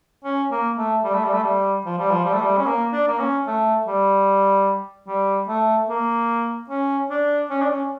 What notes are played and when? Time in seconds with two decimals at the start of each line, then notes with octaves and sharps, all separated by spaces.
0.24 C#4
0.51 A#3
0.78 A3
1.04 G3
1.14 A3
1.25 G3
1.34 A3
1.43 G3
1.85 F3
1.98 G3
2.11 F3
2.25 G3
2.33 A3
2.41 G3
2.58 C#4
2.66 A#3
2.92 D4
3.08 A#3
3.20 C#4
3.47 A3
3.87 G3
5.08 G3
5.48 A3
5.89 A#3
6.69 C#4
7.10 D4
7.50 C#4
7.62 D4
7.70 C#4